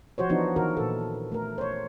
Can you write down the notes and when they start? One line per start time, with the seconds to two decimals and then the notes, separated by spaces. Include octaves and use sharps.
0.18 F3 F#4 C5 C#5
0.29 E3 F3 B3 D4 D#4 F#4
0.56 D#3 E3 F#4 A#4
0.77 A#2 A4
1.32 A3 A#4
1.58 C5 C#5